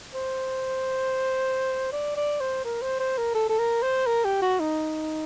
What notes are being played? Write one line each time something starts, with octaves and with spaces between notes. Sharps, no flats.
C5
D5
D5
C5
A#4
C5
C5
A#4
A4
A4
A#4
C5
A#4
G4
F#4
D#4